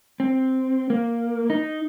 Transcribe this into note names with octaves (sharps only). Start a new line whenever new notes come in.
C4
A#3
D#4